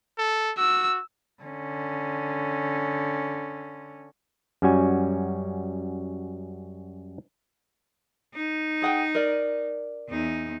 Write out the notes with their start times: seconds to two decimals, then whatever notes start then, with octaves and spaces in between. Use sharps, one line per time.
0.18 A4
0.57 F#4 E6
1.43 D3 C#4
4.62 F#2 G3 C#4 F#4 G#5
8.34 D#4
8.82 G#4 F#5 G5
9.15 A#4 D5
10.09 E2 D#4